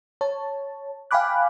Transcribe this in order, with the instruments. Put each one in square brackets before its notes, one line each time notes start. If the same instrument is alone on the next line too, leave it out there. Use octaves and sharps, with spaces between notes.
[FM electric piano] C#5 A5
F5 G5 G#5 B5 D6 F#6